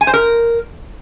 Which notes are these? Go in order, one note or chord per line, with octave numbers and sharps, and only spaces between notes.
G#5
C5
A#4